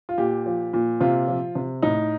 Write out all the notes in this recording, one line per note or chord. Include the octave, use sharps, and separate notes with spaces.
F4
A#2 G4
F3
A#2
C3 F4
F3
C3
A2 D#4